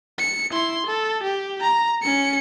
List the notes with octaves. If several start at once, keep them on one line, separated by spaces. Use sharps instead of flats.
C#7
E4 C6
A4
G4
A#5
C#4 C#7